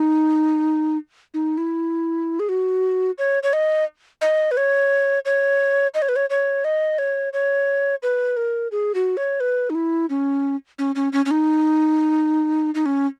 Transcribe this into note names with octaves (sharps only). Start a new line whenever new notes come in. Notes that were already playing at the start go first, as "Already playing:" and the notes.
Already playing: D#4
D#4
E4
G#4
F#4
C#5
C#5
D#5
D#5
B4
C#5
C#5
D#5
C#5
B4
C#5
C#5
D#5
C#5
C#5
B4
A#4
G#4
F#4
C#5
B4
D#4
E4
C#4
C#4
C#4
C#4
C#4
D#4
D#4
C#4